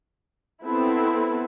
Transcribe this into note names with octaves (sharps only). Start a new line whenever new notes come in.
B3 C4 E4 A4